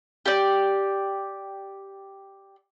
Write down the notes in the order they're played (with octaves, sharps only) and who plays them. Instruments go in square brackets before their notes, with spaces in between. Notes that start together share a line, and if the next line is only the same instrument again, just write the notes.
[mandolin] G4 D5